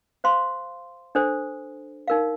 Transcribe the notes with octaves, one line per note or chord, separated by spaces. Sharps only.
C5 F5 C6
D4 A4 C5
D#4 A#4 F5